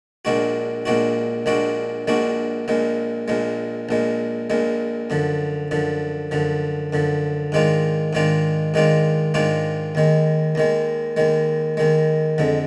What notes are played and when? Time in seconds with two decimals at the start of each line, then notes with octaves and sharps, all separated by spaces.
0.25 A#1 A#2 G#3 D4 F#4
0.85 A#1 A#2 G#3 D4 F#4
1.46 A#1 A#2 G#3 D4 F#4
2.07 A#1 A#2 G#3 D4 F#4
2.68 A#1 A#2 G#3
3.28 A#1 A#2 G#3
3.89 A#1 A#2 G#3
4.50 A#1 A#2 G#3
5.10 F#2 D3 F3
5.71 F#2 D3 F3
6.31 F#2 D3 F3
6.93 F#2 D3 F3
7.52 G#2 D#3 G#3 D4 F4
8.13 G#2 D#3 G#3 D4 F4
8.74 G#2 D#3 G#3 D4 F4
9.34 G#2 D#3 G#3 D4 F4
9.95 D#2 D#3 G#3
10.55 D#2 D#3 G#3
11.17 D#2 D#3 G#3
11.77 D#2 D#3 G#3
12.38 F2 D3 G#3